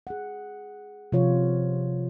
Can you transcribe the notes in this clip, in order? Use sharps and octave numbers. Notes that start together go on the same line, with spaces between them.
G#4 F#5
C3 F3 F4 C#5